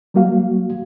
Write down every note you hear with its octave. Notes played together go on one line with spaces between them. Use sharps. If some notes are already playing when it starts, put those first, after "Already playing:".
F#3 G3 A#3 F#4 F5